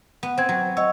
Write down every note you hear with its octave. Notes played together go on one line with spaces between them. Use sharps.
B3
C4 C5 G#6
F#3
C#5 D#5 F#5 E6